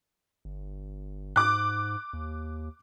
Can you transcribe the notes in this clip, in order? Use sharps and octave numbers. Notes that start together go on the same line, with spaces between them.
G1
G#2 D6 F#6
D#2